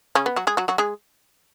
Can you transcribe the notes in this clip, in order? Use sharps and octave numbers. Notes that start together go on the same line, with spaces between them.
C#3 C#4
B3
F#3 F#4
G#3 G#4
F#3 F#4
F#3 F#4
G#3 G#4